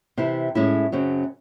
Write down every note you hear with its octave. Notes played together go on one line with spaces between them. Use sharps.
C3 E3 C4 E4
A2 G#3 C#4 E4
F#2 C#3 F#3 C4